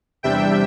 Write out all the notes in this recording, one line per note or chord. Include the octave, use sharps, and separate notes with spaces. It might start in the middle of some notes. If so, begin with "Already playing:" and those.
E2 C3 G3 D4 E5 G5